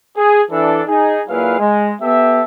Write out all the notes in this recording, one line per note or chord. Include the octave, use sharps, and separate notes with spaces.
G#4
E3 D4 A4
D#4 G#4
A#2 F#3 E4 G#4 B4 F5
G#3
B3 G4 A4 E5